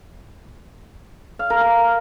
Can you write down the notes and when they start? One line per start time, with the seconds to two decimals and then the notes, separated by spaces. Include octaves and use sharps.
1.39 F5
1.50 A#4
1.61 A#4